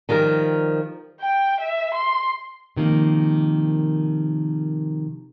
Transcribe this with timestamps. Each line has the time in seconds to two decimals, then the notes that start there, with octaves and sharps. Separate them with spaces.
0.09 D#3 F3 G3 A#4
1.21 G5
1.60 E5
1.94 C6
2.76 C3 D#3 F3 A#3